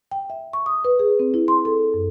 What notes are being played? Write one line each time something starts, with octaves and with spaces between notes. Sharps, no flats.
G5
E5
C#6
D#6
B4
G#4
C4
E4
C6
A4
F#2